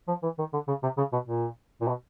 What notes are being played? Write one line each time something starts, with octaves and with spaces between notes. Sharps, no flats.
F3
E3
D#3
D3
C#3
C3
C#3
B2
A#2
A#2
B2